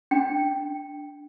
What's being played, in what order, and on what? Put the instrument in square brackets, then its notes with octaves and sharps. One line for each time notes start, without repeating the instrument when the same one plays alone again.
[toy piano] D4 G5